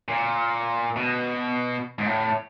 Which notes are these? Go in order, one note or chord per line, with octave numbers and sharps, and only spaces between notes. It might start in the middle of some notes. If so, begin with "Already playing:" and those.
A#2
B2
G#2
A2